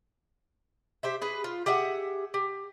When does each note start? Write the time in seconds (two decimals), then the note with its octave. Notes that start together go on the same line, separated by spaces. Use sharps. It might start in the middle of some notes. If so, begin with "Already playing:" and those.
1.03 G4 C5 E5
1.22 G#4 B4
1.44 F4
1.66 G4 G#4 E5 F#5
2.34 G4